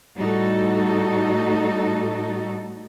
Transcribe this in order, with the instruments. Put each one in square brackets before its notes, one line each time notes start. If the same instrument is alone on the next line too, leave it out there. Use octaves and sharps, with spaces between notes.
[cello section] A2 G3 D#4 F#4 A4